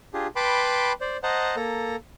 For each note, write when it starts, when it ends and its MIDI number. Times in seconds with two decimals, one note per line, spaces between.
0.14 0.27 62
0.14 0.27 65
0.14 0.27 67
0.14 0.27 68
0.36 0.93 71
0.36 0.93 79
0.36 0.93 81
0.36 0.93 83
0.36 0.93 84
0.36 0.93 86
1.01 1.17 72
1.01 1.17 74
1.23 1.56 72
1.23 1.56 75
1.23 1.56 78
1.23 1.56 81
1.23 1.56 82
1.56 1.96 58
1.56 1.96 69
1.56 1.96 82